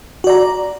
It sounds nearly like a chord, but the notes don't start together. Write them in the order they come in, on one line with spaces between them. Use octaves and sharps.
F#4 D5 A#5